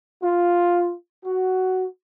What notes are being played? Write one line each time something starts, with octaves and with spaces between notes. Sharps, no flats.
F4
F#4